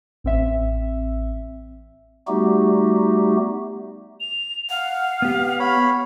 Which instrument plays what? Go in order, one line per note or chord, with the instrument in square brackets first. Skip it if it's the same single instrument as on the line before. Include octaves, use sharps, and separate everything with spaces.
[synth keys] A1 C4 E5
[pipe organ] G3 A3 B3 D#4 F#4 G4
[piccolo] F7
[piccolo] F5 [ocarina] F#5
[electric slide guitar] B3 G4
[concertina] C#5 B5